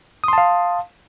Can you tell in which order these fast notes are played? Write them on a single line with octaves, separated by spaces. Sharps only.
D#6 C6 A5 F5